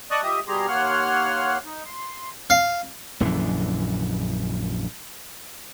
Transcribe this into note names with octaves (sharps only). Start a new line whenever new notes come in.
D5 D#5 A5 C#6 D#6 F#6
F3 G4 D#5 E5 D#6
B2 G3 G4 G#4 A#5 C6
D#2 A#3 C#5 F#5 C6 F6
D#4
C6
F5
A#1 F#2 D3 E3